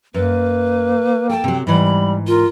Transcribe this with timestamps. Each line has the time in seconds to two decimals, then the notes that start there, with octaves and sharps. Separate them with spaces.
0.14 F#2 A#3 B4
1.29 A4 G5 A5
1.44 C3 F#3
1.67 G#2 E3 G3 B5
2.27 F4 A#4